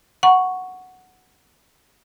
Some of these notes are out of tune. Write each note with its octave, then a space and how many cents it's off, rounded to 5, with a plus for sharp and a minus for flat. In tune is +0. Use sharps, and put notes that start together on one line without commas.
F#5 +0 A#5 +45 C#6 +0